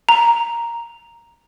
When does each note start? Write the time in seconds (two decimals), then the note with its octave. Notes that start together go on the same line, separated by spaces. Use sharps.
0.09 A#5